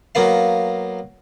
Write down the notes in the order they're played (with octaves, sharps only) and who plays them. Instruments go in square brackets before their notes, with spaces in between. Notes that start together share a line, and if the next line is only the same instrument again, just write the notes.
[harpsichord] F#3 A#3 B3 F5